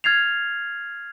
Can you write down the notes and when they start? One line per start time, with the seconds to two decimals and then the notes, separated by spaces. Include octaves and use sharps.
0.04 F6 G#6 A6 C7 F7